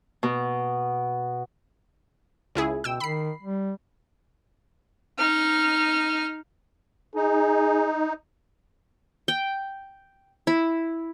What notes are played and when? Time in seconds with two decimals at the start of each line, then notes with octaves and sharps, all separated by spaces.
0.23 B2
2.55 C#2 E4 G#4
2.84 B2 G5 E6
3.00 D#3 B5 C7
3.42 G3
5.18 D#4 F6
7.15 D#4 G#4
9.28 G5
10.47 E4